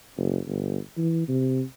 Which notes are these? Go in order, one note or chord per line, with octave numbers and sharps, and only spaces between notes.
F#1
G1
E3
C3